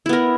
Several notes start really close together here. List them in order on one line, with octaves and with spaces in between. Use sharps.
E4 B3 A#4